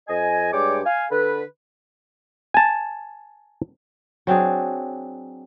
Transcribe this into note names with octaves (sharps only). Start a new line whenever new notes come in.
F2 D#5 G#5
G2 G#3 C#5 D5 G5 D6
F5 G#5
D3 A4 B4
G#5 A5
F#3 C4 D4 G#4